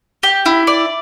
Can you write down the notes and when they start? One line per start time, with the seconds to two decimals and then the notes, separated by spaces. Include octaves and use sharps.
0.23 G4
0.46 E4
0.67 D5